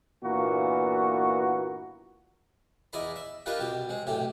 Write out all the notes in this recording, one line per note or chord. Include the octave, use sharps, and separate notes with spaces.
G2 A#2 E3 A#3 B3 F#4
E2 E4 D5 D#5 A#5 B5
E5
D4 F4 G4 A#4 B4 D#5
C2 B2 G4
G#3 C4
B1 A2 C3 G4